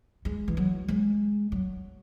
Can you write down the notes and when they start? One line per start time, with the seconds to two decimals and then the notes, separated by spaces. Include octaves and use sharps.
0.25 G#3
0.48 E3
0.57 F#3
0.88 G#3
1.52 F#3